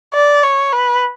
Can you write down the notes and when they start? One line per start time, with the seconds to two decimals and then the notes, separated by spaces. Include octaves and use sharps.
0.14 D5
0.44 C#5
0.73 B4